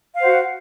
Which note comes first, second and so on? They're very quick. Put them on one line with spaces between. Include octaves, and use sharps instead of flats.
F5 C5 F#5 F#4